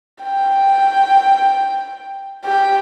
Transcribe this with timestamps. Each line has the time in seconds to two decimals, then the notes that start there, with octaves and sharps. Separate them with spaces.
0.24 G5
2.45 G4 G5